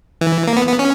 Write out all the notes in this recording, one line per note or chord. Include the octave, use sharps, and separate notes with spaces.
E3
A#3
B3
B3
C#4